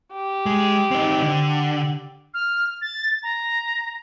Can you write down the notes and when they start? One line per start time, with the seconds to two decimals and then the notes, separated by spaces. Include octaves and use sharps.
0.13 G4
0.46 G#3
0.91 C4 D#4
1.22 D3
2.34 F6
2.82 A6
3.23 A#5